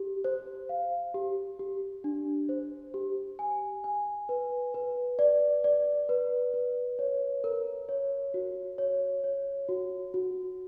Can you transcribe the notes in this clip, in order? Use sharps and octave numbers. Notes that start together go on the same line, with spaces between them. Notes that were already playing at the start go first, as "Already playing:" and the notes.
Already playing: G4
C5
F5
G4
G4
D4
C5
G4
G#5
G#5
B4
B4
D5
D5
B4
B4
C#5
A#4
C#5
F#4
C#5
C#5
F#4
F#4